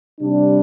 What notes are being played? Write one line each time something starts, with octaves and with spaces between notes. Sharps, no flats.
C3 G3 D4